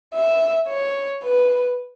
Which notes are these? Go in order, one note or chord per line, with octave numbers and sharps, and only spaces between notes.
E5
C#5
B4